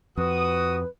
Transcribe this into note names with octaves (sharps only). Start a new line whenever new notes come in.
F2 F#4 B4 D#6